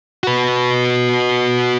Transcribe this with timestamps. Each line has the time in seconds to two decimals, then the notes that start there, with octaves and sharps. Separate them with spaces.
0.23 F#4 B4